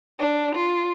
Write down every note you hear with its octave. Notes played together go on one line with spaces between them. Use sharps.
D4
F4